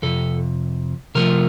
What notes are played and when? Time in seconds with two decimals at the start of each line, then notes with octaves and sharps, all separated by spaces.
0.02 F2 C3 A4
1.15 C3 F3 A3 A#4